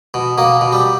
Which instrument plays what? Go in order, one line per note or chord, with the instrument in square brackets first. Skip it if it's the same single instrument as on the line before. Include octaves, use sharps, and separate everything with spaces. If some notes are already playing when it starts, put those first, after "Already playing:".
[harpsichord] B2
B2 A#3
B2
G3